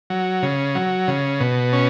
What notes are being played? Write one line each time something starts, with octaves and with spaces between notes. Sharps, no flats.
F#3
C#3
F#3
C#3
B2
C#4